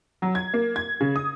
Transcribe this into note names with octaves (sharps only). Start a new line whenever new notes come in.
F#3
G#6
A#3
G#6
C#3
D#6